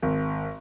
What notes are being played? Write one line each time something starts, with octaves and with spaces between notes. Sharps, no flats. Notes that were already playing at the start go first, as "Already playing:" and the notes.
G#1